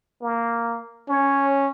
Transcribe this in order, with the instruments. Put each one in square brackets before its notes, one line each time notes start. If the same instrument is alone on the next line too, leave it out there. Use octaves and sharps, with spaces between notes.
[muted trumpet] A#3
[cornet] C#4 [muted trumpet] C#5